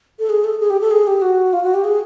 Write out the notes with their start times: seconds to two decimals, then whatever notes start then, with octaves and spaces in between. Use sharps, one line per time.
0.19 A4
0.29 G#4
0.44 A4
0.60 G#4
0.70 G4
0.81 A4
0.91 G#4
1.07 G4
1.22 F#4
1.53 F4
1.63 F#4
1.74 G4
1.84 G#4